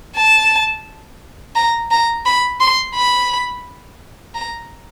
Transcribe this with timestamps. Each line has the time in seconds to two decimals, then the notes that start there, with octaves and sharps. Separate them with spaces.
0.17 A5
1.56 A#5
1.91 A#5
2.26 B5
2.61 C6
2.95 B5
4.35 A#5